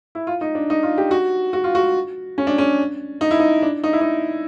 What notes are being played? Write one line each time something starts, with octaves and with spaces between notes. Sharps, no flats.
E4
F4
D#4
D4
D#4
F4
G4
F#4
F#4
F4
F#4
C#4
D4
C#4
D#4
E4
D#4
D4
D#4
E4
D#4